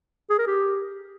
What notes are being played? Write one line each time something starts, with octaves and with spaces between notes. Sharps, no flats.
G#4
A#4
G4